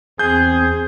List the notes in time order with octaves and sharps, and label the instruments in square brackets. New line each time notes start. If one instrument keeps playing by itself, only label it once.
[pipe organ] E2 C4 [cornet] G#4 [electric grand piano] G6